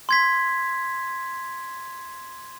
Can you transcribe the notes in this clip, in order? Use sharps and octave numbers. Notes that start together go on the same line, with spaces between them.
C6 G#6 B6